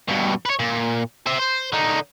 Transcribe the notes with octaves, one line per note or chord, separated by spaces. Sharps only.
G2 B2
B4 C#5
A#2
C5 E5
C5
D3 D#4